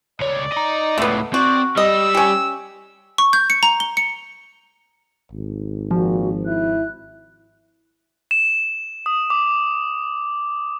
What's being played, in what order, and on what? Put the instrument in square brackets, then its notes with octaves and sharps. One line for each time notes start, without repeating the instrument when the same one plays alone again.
[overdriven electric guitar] C#2 C#5 [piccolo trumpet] D5
[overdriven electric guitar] D#5 A#5
[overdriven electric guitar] C#2 A2 [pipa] A3 B3
[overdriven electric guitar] C4 [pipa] F#4 [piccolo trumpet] D5
[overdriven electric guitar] G3 [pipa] D#5 [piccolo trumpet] E6
[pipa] C#4 G4
[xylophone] C#6
G6
C#7
A#5
G7
C#7
[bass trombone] G#1
[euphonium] A#2 [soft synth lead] F3 [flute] F#4
[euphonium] E4 [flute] F#6
[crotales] E7
D#6
D6